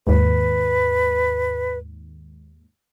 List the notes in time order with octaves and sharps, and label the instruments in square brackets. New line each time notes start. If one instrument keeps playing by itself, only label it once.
[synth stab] D#2 G#2 [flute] B4